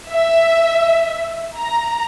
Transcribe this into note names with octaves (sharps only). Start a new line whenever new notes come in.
E5
A#5